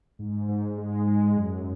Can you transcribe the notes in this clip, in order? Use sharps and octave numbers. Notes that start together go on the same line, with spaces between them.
G#2
G#2
G#3
G#3
F#2